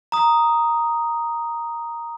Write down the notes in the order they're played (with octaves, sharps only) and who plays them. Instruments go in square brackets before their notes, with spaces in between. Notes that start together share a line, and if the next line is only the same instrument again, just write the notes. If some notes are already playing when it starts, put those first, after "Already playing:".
[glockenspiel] A#5 D#6